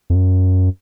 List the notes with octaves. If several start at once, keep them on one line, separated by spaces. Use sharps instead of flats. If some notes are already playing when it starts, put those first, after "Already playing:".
F2
F#2